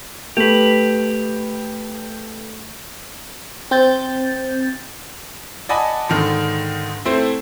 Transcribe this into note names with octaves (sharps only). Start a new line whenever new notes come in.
A3 G4 B4
C4 G6 A6
D5 D#5 F#5 G#5 A5 B5
G#2 D3 D#3
A3 C4 E4 C5